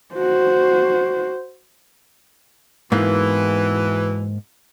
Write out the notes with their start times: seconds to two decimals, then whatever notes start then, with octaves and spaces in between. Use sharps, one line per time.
0.15 F#4 C5
2.92 E2 G#2 B2 E3 A#3